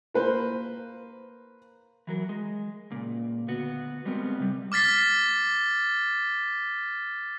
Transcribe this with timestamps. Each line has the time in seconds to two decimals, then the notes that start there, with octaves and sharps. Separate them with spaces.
0.14 A#3 B4 C5
2.07 E3 F#3 A#4
2.29 G#3
2.90 C#2 A#2
3.48 D2 B3 F#4
4.05 G3 G#3 B3 C4 A#4
4.40 C3 G3
4.72 D6 F6 A6 B6 C7